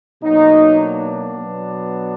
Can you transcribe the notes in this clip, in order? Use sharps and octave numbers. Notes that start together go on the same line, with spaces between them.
B2 F#3 A#3 D#4
D4
B2 F#3 B3